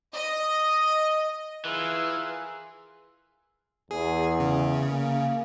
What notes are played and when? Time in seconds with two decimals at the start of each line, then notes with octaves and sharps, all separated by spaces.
0.14 D#5
1.65 E3 F4 G#4 A#4 B4 E5
3.91 E2 G#4
4.40 C#3
4.87 A#3